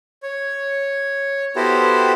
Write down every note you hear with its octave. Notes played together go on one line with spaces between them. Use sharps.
C#5
B3 E4 F#4 G4 A4 C5